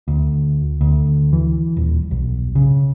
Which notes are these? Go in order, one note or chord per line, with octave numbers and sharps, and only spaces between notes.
D2
D2
E3
D#1
B1
C#3